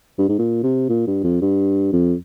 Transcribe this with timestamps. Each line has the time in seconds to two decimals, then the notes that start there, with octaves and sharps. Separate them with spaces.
0.19 G2
0.29 G#2
0.39 A#2
0.63 C3
0.89 A#2
1.07 G2
1.24 F2
1.42 G2
1.93 F2